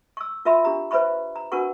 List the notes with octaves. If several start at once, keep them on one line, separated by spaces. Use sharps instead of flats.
C#6 E6
F4 A#4 E5 B5 C6
D4 G4 A#5
B4 C5 E5 B5 C#6
A#5
D4 F#4 A#4 B4 F#5 C#6